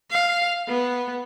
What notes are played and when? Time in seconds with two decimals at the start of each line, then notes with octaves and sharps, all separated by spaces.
0.10 F5
0.68 B3